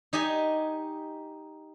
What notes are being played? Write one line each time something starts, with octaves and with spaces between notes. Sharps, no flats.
D#4 G4 D#5 G#5